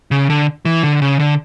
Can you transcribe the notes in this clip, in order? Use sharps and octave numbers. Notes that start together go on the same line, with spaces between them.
C#3
D3
E3
D3
C#3
D3